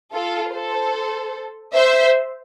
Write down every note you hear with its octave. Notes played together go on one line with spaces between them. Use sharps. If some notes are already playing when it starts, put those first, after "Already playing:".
F4 A4
A4 C5
C5 E5